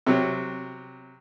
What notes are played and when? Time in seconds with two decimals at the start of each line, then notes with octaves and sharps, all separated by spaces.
0.07 C3 F#3